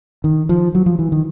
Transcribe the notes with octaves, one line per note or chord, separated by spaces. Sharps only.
D#3
F3
F#3
F3
E3
D#3